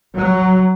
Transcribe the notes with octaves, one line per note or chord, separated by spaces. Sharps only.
F#3